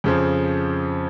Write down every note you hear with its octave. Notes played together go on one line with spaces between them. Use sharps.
F2 C#3 F3